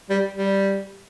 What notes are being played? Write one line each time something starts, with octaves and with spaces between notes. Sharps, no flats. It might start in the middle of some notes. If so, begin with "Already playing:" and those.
G3
G3